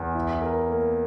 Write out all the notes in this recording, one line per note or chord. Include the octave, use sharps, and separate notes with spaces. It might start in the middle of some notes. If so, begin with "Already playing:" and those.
Already playing: E2
E4
A#4
A#3